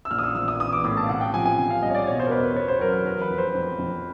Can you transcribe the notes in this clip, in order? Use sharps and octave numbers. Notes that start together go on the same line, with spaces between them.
E6
A#1 F6
D#6
E6
A#1 E6
D#6
E3 D#6
D6
A2 D#6
A5
F5
C3 F#5
G5
F3 G#5
G#5
C3
F5
C2 D#5
C#5
D5
B2 C#5
C5
A#4
E2 B4
B4
E2 C#5
C5
F#3 A#4
B4
E3 A#4
B4
F2
C5
F2
F2